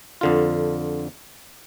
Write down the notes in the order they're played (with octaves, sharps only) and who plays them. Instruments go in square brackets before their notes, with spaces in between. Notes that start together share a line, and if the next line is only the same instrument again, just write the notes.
[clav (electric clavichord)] F2 D3 F4